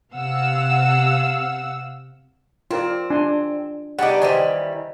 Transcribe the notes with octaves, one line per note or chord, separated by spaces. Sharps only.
C3 F5 F#5 E6
C4 F4 A#4 D5
D4 G#5 C6
G3 B3 D#4 F#5 G#5 D6
D#3 E3 G3 C5 D5 G#5